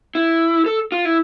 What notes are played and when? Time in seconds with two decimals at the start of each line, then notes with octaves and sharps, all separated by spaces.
0.15 E4
0.66 A4
0.92 F4
1.05 E4